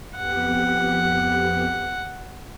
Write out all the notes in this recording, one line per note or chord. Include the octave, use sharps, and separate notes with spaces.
F2 B3 G4 F#5